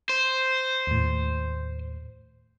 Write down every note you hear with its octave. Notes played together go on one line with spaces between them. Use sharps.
C5
D#2 A2